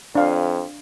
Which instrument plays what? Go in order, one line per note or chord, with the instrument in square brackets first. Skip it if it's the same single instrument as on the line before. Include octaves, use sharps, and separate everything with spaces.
[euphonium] F2 [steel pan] D4 F5